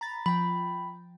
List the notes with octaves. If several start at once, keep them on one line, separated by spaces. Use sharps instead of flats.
A#5 B5 A6
F3 G5 B5